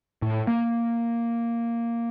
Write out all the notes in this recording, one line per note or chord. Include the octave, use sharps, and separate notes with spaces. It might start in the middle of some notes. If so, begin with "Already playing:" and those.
A2
A#3